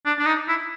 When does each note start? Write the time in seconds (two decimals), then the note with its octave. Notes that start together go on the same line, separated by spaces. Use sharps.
0.06 D4
0.19 D4
0.26 D#4
0.48 E4